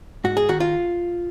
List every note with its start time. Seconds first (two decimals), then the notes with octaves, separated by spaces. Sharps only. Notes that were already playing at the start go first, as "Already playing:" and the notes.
0.24 G#2 F#4
0.37 G#4
0.49 D#3 F#4
0.60 F4